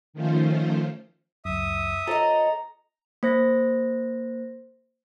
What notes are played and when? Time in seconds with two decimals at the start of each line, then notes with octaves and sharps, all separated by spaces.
0.13 D#3 F3 A3 C#4 F4 C5
1.45 C#2 F#2 E5 D#6
2.07 F4 A4 C5 C#5 D#5 A#5
3.23 A#3 C5 A#6